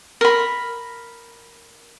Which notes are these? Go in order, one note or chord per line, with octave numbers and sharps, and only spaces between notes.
A#4 B5